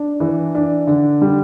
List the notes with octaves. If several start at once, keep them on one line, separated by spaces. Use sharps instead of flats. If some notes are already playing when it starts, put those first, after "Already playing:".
Already playing: D4
E3
D4
D3
G3